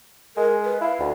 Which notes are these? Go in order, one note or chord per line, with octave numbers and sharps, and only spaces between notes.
G#3 A#4
B4
E4 F5
D2